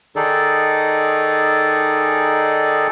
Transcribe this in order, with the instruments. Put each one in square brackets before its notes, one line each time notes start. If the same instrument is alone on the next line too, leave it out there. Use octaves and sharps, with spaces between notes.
[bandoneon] D#3 D#4 G#4 A4 D5